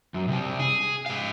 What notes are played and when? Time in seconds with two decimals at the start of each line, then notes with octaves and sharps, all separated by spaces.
0.14 F#2
0.28 C2 C3
0.59 G#4
1.06 G#2 F5